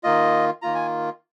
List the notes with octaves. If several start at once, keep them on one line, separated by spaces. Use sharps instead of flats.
D#3 A#3 F4 D#5
D#3 A#3 F4 A#5
G#5